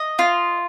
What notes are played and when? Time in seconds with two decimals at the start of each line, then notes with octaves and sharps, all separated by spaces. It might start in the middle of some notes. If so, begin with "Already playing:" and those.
Already playing: D#5
0.19 F4